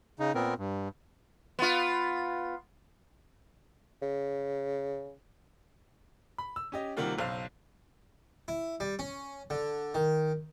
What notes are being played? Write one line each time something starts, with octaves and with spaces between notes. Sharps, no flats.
C#3 D#4
A#2 B3 C4 A#4
G2
B3 F4
C#3
B5
E6
C#4 G4 D#5
C3 D#3 G3 A#3 F4 F#4
F#1 B1 C5 F5
E4
G3
C#4
D3
D#3